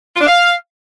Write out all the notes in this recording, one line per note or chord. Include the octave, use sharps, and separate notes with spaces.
F4
D4
F5